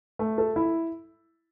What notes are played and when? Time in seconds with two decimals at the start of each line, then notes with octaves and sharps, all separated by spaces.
0.19 A3
0.38 A4
0.56 E4